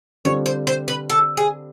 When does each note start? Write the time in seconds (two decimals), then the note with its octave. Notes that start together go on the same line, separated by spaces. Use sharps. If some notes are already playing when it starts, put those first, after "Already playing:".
0.25 D3 G3 C4 F4 C#5
0.46 C5
0.67 C5
0.88 B4
1.09 A4
1.37 G#4